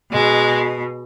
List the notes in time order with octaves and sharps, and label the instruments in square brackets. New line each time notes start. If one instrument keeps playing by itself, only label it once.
[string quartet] B2 G#3